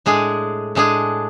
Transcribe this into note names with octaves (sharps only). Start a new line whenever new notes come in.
A2 G#3 D4 G#4
A2 G#3 D4 G#4